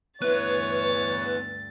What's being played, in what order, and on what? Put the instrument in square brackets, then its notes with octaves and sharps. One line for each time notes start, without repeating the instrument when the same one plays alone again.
[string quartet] D2 G2 A6 [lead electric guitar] B3 E4 [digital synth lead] B4 [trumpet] C#5